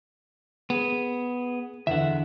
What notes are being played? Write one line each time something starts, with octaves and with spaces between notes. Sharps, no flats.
B3 G#4
E2 D3 E5 F#5